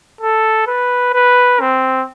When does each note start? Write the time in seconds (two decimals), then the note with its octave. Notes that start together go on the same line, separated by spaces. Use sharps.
0.21 A4
0.67 B4
1.14 B4
1.60 C4